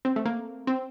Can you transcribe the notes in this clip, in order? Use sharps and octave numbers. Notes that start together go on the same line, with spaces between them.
C4
A3
A#3
C4